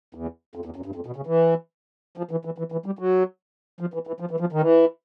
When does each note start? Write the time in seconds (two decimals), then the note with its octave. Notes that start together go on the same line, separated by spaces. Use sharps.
0.15 E2
0.55 F2
0.65 E2
0.76 F#2
0.86 G2
0.96 F2
1.06 B2
1.16 C#3
1.27 E3
2.18 F3
2.31 E3
2.45 E3
2.58 E3
2.72 E3
2.86 G3
2.99 F#3
3.81 F3
3.94 E3
4.07 E3
4.20 F3
4.31 E3
4.40 F3
4.52 D#3
4.61 E3